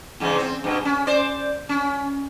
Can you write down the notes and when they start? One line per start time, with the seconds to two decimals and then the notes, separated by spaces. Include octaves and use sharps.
0.20 E2 G#2 C#3
0.38 C4
0.64 G2 B2
0.85 C#4
1.07 C5 D5
1.69 C#4